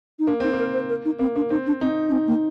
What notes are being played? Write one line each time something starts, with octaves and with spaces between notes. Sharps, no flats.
D#4
A#3 D4
C4 D#4
A#3
A#4
C5
A#4
D#4
A#3 C4
A#3 D4
C4 D#4
D4
C4 D#4
D4
C4
A#3